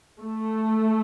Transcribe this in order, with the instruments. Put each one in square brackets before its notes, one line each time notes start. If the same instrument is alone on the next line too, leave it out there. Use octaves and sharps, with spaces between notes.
[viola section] A3